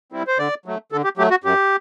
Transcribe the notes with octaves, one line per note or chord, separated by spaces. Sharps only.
G3 C4 E4
C5
D3 D5
F#3 A3
D3 A4
G4
F#3 A3 G4
F#4
F#2 G4